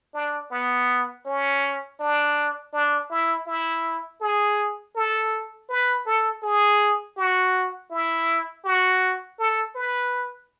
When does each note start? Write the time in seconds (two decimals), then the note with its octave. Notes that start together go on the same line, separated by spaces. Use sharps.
0.14 D4
0.51 B3
1.25 C#4
2.00 D4
2.73 D4
3.10 E4
3.47 E4
4.20 G#4
4.95 A4
5.69 B4
6.06 A4
6.42 G#4
7.17 F#4
7.91 E4
8.64 F#4
9.39 A4
9.75 B4